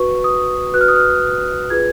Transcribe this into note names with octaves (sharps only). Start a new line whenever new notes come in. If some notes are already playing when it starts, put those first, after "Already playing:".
Already playing: F#4 B4 C#6
D#6
F#4 B4 F#6
F6
D#6
F6
F4 G#4 B4 G#6